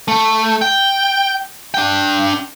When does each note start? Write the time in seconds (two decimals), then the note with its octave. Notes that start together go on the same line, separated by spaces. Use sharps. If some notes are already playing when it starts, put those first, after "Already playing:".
0.08 A3
0.62 G5
1.74 D4 G5